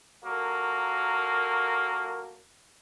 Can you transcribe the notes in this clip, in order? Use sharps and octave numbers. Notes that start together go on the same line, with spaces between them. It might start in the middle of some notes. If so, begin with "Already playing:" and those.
A#2 F#3 A#3 A4